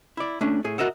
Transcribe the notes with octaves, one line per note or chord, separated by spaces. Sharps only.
E4 D5
A3 C#4 D4
A2 G#4
F#4 A#4 D#5 E5 F#5